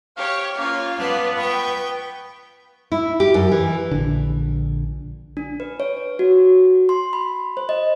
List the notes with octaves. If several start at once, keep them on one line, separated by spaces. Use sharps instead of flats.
G4 C#5 F5 C#6
A#3 C#4 F4 C#5 F5
B3 B4 D5 A5
G5 C#6
E4
G4
F#2
E3
A#1 D3
D4
B4
C#5
F#4
C6
B5
C5
D#5